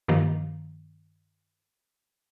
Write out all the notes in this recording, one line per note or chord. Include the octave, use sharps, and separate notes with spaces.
G2 D#3 F3 A#3